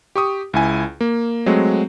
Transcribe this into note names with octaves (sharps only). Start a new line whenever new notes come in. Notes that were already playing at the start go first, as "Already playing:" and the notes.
G4 C#6 D#6
C#2 E4 G#5
A#3
F#3 G#3 A3 C4